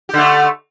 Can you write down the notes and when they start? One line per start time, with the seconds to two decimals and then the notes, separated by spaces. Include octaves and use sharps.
0.09 G4
0.14 D3
0.18 A3